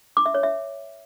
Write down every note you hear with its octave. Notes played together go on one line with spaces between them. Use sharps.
D6
E5
C#5
E5